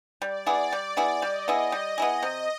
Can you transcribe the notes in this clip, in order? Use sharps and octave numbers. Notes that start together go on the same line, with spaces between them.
G3 D5
B3 E4 G#4
G3 D5
B3 E4 G#4
G3 D#5
B3 E4 G#4
G3
B3 E4 G#4
C3